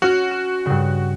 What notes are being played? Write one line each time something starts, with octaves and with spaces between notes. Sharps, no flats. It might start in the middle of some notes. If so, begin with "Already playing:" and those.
C#4 F#4 F6
E7
G2 C#3